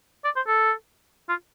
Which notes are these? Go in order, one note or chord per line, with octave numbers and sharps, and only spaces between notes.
D5
C5
A4
F4